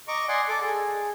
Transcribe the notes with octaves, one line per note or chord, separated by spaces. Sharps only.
D#5 A#5 C#6 D6
D5 D#5 F#5 G#5 C6
A4 D6
G#4